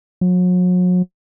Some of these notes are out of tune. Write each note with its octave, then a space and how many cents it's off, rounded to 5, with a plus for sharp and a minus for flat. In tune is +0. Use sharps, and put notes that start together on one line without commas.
F#3 -40